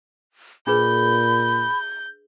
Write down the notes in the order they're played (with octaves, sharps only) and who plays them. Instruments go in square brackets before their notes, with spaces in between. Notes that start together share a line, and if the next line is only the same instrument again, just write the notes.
[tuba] A#2 [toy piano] D4 G#4 B4 [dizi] B5 [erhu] G6